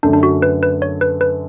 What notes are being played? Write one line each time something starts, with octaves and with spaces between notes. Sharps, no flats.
F#2 D3 A3 D4
D4
F#4
B4
B4
C#5
B4
B4